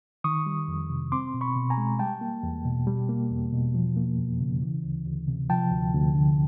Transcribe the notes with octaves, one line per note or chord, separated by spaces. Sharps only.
D#3 C#6 D#6
G3
F2
C3
C4 C6 D6
B2
B5 C#6
B2
G#5 A#5
G#3
G3 G5 A5
A#3
E2
B2
G3
A#3
E2
B2
F3
A#3
F2
C#3
E3
D2
D2
C3
F3 G5 A5
D2
D2
D3